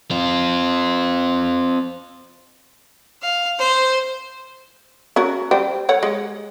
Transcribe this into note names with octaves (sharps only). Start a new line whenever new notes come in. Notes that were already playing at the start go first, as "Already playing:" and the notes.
C4 F4
F5
C5
C#4 F#4 A#4
G3 C5 G5
A4 C#5 F#5
G#3